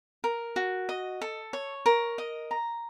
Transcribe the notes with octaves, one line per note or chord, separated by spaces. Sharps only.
A#4
F#4
D#5
A4
C#5
A#4
D#5
A#5